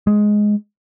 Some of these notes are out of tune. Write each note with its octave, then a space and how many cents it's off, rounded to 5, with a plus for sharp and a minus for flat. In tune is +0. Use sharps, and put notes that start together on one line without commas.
G#3 +5